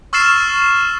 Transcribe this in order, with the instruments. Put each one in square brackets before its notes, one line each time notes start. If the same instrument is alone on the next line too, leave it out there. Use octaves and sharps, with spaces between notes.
[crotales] C#6 E6 F6 A6 C7 E7